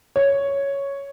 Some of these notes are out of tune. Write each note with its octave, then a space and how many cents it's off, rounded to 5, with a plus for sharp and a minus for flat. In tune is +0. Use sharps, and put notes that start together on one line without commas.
C#5 +0